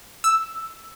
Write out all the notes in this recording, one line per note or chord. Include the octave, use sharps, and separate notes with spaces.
E6